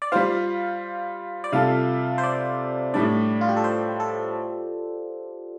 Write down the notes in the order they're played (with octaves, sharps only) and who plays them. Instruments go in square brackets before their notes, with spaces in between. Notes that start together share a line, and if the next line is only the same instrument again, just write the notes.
[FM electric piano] D5
[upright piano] G3 F4 C5 [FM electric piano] F5
[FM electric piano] D5
[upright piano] C3 G3 F4 A4 [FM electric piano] F5
[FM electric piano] C5
D5
[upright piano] A2 G3 D4 [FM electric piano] D5
[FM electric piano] F4
G4
A4
C5
A4